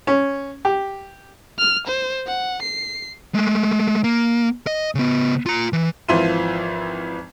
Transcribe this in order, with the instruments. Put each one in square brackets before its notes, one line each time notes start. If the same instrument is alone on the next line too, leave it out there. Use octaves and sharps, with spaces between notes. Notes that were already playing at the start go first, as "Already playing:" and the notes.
[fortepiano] C#4
G4
[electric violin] F6
C5
F#5
C7
[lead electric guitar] G#3 A3
A#3
D#5
C#3 B3
F4 A#5
E3
[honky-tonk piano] G#1 E3 F3 E5 C6 D#7